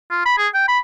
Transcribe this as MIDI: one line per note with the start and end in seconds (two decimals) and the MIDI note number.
0.11 0.22 65
0.25 0.36 83
0.38 0.47 68
0.54 0.65 79
0.68 0.79 83